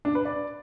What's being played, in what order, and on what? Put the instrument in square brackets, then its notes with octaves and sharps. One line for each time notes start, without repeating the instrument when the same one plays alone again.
[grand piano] D4
B4
D5